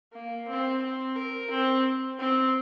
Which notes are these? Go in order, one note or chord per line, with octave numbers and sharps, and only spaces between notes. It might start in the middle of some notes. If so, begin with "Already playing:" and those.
A#3
C4
C4
A#4
C4
C4